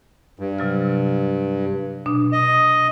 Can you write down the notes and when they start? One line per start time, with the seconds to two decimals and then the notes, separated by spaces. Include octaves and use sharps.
0.39 G2
0.58 C3 F#3 F6
2.06 B2 D4 D#6
2.32 D#5